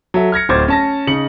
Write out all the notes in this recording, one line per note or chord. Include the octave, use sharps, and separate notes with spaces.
F#3 A4 E5
F6 G#6 A#6 C#7
D1 C5 D6 G#6 A6
C#4 A5 A#6
C#3 D#4 D#5 C#7 F#7